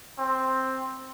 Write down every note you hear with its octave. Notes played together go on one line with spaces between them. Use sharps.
C4